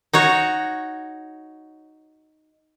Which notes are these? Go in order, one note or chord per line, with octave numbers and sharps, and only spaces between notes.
D#4 F#4 C#5